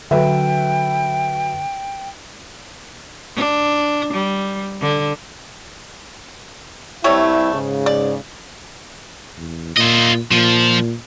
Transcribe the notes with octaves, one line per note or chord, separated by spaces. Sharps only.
D3 F#3 B4 E5 G5
D4
G3
D3
C2 G3 A3 E4 C#5
G#2 C#3
D5
E2
A#2 F4 D#5
A#2 F3